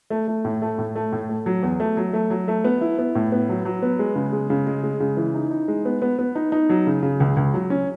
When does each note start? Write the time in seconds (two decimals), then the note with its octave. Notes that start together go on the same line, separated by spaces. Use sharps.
0.10 A3
0.28 A3
0.45 A2
0.62 A3
0.78 A2
0.95 A3
1.12 A2
1.29 A3
1.46 F#3
1.63 E2
1.80 A3
1.97 F#3
2.13 A3
2.30 F#3
2.48 A3
2.64 B3
2.81 E4
2.99 B3
3.15 A2
3.32 B3
3.49 F#3
3.65 F#3
3.83 B3
3.99 G#3
4.16 C#3
4.33 G#3
4.50 C#3
4.67 G#3
4.83 G#3
5.00 C#3
5.17 E3
5.35 D#4
5.51 D#4
5.68 G#3
5.85 B3
6.02 B3
6.19 B3
6.35 D#4
6.52 D#4
6.70 F#3
6.87 C#3
7.03 C#3
7.20 C#2
7.37 C#2
7.54 F#3
7.70 C#4